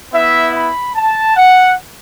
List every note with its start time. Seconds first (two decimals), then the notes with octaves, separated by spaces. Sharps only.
0.12 B3 E4 E5
0.54 B5
0.95 A5
1.36 F#5